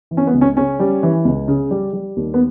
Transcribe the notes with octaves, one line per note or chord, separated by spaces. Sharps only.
E3
C#4
B3
C#2
C#4
C#3 C#4
G3
E3
C#2
C#3
G3
G3
D#2
B3